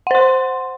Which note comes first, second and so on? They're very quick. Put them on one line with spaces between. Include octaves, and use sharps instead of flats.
F#5 C5 C6